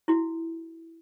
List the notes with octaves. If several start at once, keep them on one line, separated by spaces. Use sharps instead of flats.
E4 F#4